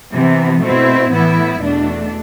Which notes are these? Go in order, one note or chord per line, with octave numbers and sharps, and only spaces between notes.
C3 E3 B3
B2 A3 C4 E4
A2 E3 B3 E4
E2 B2 A3 D4